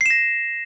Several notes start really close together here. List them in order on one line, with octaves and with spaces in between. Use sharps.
C7 E7 A#6